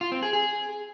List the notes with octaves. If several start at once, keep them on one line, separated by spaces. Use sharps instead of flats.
F4
C4
G#4
G#4